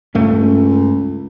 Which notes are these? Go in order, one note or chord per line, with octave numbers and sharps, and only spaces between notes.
C#2 G2 A3 C#4